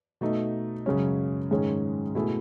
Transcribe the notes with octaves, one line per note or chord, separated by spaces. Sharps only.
B2 A3 D#4
F#2 C#3 G#3 C#4
G#2 D#3 G#3 C#4 G#4
B2 A3 E4 G#4